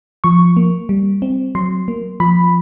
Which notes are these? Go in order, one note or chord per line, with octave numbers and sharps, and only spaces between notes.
F3 C#6
A#3
G3
C4
F#3 C6
A#3
F3 B5